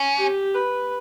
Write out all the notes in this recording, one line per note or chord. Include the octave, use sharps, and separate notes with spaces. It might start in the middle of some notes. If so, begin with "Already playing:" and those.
Already playing: C#4
G4
B4